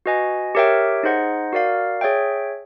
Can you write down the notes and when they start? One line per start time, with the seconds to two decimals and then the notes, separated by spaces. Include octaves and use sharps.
0.06 F#4 B4 D#5 G#5
0.55 G4 A#4 C#5 E5 G5
1.03 D#4 G#4 C5 D#5 F#5
1.53 F#4 A#4 D5 F5
2.01 G#4 C#5 E5 G5